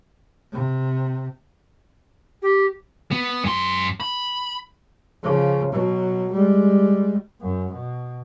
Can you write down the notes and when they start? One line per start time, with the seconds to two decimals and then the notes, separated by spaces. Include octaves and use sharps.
0.52 C3
2.42 G4
3.11 B3
3.44 F#2 C6
4.00 B5
5.22 C#3 F3
5.72 B2 F#3
6.32 G3 G#3
7.41 F#2
7.74 B2